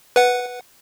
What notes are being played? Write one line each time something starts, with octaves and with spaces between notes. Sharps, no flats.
B4 F#5